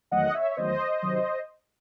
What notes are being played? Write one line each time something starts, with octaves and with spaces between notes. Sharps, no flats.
E2 D#3 F#3 A3 D#5 F#5
C#5 E5
E5
E2 D#3 F#3 A3 C5 D#5
C3 D#3 F#3